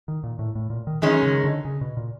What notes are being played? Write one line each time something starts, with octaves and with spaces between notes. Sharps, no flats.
D#3
A#2
A2
A2
A#2
D#3
F#2 D#3 E3 G#3 C#4
C#3
D3
C#3
B2
A#2